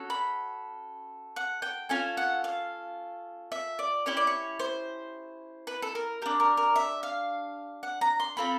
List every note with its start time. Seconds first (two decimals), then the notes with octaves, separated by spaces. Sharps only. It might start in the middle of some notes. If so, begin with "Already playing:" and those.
Already playing: C#4 F#4 A4
0.10 B5
1.36 F#5
1.62 G5
1.89 C#4 F4 A4 G#5
2.17 F#5
2.44 F5
3.52 E5
3.79 D5
4.06 C#4 E4 G4 C#5
4.17 D5
4.27 C#5
4.60 C5
5.67 B4
5.82 A4
5.95 A#4
6.22 D4 G4 A#4
6.40 A#4
6.57 A#4
6.76 E5
7.03 F5
7.83 F#5
8.01 A#5
8.20 C6
8.37 C4 F4 A4 B5